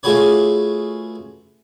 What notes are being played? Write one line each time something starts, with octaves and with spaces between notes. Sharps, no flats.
A3 F4 F#4 G#4 B4 C#5